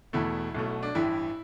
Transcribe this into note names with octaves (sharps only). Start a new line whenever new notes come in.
E1 E2 B2 A3 E4
B1 B2 A3
D4
A1 G2 E3 E4